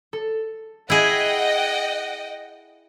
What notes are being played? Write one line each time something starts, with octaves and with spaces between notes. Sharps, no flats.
A4
E4 G#4 D#5 F#5 G5